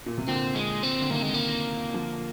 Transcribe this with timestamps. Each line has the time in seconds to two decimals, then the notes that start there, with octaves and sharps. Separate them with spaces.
0.06 A#2
0.18 C3
0.27 A#2 D3 C4
0.55 G#3
0.83 C4
1.01 D3
1.10 C3 D#3 A#3
1.22 G#3
1.34 A#3
1.94 D3 F3